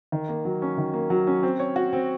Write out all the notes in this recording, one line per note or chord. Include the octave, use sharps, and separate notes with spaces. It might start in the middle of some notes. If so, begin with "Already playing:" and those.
D#3
A#3
F#3
C#4
D#3
A#3
F#3
C#4
C4
C#5
F#4
C4